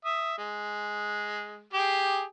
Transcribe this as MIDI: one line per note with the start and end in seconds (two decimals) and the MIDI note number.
0.05 0.34 76
0.05 0.34 87
0.38 1.65 56
1.73 2.23 67
1.73 2.23 68
1.73 2.23 79